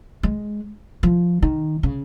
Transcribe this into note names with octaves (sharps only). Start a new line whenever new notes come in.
G#3
F3
D#3
C#3